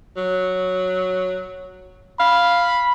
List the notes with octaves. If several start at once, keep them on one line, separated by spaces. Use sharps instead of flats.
F#3
F5 B5